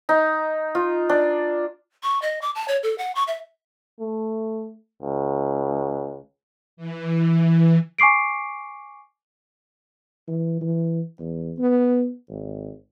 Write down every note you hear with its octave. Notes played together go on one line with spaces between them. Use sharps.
D#4
F4
D4
C#6
D#5
D6
A5
C#5
A4
F#5
C#6
E5
A3
C#2
E3
G#5 C#6 D6 C7 D7
E3
E3
E2
B3
G#1